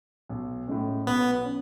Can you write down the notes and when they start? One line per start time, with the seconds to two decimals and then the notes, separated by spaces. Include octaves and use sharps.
0.29 B1
0.68 A2 G#3 C#4
1.06 B1 B3
1.45 C#4